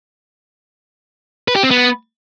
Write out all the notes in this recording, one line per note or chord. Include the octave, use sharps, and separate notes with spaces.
B4
G4
C4
B3